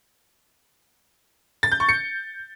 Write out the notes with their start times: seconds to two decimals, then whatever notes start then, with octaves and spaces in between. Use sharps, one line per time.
1.63 A6
1.72 G6
1.80 C#6
1.89 C#7